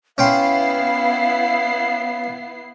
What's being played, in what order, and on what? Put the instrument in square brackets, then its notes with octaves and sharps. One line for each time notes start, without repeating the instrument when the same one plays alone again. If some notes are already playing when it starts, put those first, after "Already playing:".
[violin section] B3 E4 C7 [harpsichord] C#4 G5 C6 [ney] F5